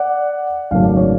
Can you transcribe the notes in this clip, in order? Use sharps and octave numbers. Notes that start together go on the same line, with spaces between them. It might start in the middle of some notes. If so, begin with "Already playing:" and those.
Already playing: D5 F#5
G#1 F#2 C#3 F#3 A3 F5
D5
C#5 F5